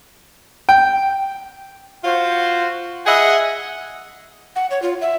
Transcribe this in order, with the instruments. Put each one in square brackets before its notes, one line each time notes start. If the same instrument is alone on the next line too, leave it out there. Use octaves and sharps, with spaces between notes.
[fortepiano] G5
[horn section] F4 F#4 C5
G#4 D#5 E5 F#5
[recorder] F#5
C#5
F4
E5